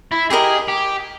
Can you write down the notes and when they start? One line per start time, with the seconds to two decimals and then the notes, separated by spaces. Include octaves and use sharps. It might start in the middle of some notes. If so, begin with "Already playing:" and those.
0.12 E4
0.30 E4 G4 G#4 A#4 D#5
0.68 G4